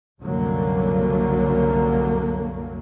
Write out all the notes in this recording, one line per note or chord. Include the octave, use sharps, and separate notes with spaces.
C2 F#2 D3 F#3 A#3